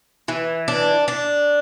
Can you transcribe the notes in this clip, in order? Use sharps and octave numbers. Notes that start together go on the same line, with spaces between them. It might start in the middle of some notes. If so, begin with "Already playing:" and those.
E3
D4
D4